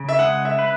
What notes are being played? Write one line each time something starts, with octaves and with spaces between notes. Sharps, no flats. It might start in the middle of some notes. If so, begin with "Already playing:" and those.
Already playing: C#3
E5
G#3 F#5
E5
B4